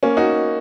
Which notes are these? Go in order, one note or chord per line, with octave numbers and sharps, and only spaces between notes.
A#3 C#4
D#4 F#4